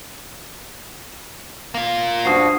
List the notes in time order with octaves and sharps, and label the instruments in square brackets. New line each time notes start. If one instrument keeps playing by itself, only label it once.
[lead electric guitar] A#3 F4
[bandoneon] G2 F3 F#4 [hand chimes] D4 D#6 C7